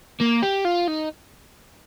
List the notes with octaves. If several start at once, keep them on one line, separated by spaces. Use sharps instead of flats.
A#3
G4
F4
D#4